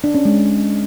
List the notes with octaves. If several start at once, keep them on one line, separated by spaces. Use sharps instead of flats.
D4
C#4
G#3